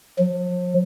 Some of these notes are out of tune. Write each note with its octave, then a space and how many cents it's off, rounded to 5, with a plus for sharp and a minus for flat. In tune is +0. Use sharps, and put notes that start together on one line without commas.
F3 +45